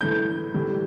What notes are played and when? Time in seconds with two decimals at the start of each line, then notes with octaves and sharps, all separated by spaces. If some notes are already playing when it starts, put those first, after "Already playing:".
0.01 A2 E3 A3 G6
0.54 A2 E3 G3